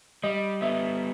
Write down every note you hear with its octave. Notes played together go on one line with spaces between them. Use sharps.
G3 D#5
B3 E5